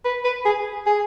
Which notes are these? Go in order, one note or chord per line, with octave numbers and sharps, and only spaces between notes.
B4
B4
G#4
G#4